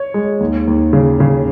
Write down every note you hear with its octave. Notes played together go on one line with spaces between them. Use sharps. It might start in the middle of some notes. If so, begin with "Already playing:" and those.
Already playing: C#5
G#3
D#2
D#2
C#3
C#3